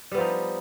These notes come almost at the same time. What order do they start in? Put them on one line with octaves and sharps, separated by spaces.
G3 B3 F3 D#4